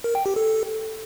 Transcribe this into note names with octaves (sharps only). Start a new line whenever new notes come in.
A#4
G5
G4
A4